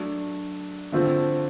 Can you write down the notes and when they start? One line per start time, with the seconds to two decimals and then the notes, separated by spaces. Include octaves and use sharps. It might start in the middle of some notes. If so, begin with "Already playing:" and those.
Already playing: F#3 A3 D4
0.92 D3 F3 A3 C4 F4